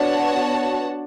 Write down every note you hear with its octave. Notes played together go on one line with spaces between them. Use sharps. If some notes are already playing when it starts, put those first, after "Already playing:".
Already playing: B3 D4 F#4 C#5 F#5 A5